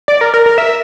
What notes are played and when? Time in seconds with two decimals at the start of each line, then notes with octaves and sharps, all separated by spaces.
0.08 D5
0.21 A#4
0.34 A#4
0.46 A#4
0.58 E5